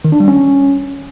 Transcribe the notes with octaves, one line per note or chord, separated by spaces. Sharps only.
D#3
D4
G3
C#4